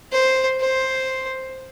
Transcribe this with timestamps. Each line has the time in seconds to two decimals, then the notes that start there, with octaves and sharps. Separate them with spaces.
0.12 C5
0.60 C5